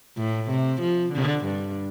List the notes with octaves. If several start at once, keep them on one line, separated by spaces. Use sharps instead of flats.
A2
C3
F3
D3
G2